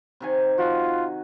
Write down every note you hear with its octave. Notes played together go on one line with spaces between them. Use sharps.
C3 D#3 G#5
F4 F#4